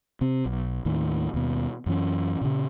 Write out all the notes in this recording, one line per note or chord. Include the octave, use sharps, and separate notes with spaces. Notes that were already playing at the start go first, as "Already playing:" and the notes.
C3 C4
B1
D#2 A2 D#3
D#2 B2
F#2 E3 C#4
A#2 C#3